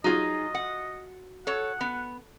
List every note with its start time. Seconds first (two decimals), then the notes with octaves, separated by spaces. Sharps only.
0.04 F#3 D#4 F4 G#4 D#5
0.55 F#5
1.47 A4 C#5 F#5
1.81 B3